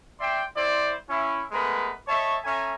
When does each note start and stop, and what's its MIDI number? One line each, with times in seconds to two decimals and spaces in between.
0.20 0.42 74
0.20 0.42 76
0.20 0.42 79
0.20 0.42 84
0.55 0.92 60
0.55 0.92 64
0.55 0.92 72
0.55 0.92 74
1.08 1.43 61
1.08 1.43 64
1.51 1.93 56
1.51 1.93 57
1.51 1.93 59
1.51 1.93 70
1.51 1.93 71
2.07 2.37 73
2.07 2.37 75
2.07 2.37 76
2.07 2.37 81
2.07 2.37 85
2.44 2.74 61
2.44 2.74 69
2.44 2.74 76
2.44 2.74 80
2.44 2.74 82